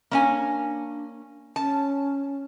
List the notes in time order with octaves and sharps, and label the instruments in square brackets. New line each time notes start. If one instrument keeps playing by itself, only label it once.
[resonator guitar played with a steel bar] A#3 C#4 G#5 [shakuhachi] D4
[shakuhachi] C#4 [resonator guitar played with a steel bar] A5